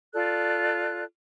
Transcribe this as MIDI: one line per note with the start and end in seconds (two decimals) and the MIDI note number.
0.13 1.04 65
0.13 1.04 69
0.13 1.04 74
0.13 1.04 90